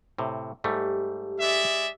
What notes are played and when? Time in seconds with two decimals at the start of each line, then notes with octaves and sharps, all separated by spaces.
0.18 A2 C3
0.64 G#2 G3 A3 G4
1.40 G#3 D5 E5